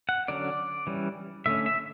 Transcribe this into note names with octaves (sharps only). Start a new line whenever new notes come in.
F#5
D3 F#3 C#4 D5
E3 G3 C#4
D3 A3 C#4 E5
E5